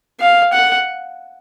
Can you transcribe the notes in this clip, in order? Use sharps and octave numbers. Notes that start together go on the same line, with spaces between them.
F5
F#5